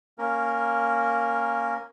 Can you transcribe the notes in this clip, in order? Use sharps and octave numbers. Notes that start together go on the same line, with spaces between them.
A#3 C#4 A#4